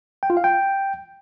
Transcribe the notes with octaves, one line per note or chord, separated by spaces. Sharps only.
G5
F4
F5
G5